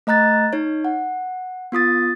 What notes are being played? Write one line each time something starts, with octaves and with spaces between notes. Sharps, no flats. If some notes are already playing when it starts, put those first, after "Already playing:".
A3 D#5 A#5 F#6 A6
D#4 C#5
F#5
B3 F4 D#6 A6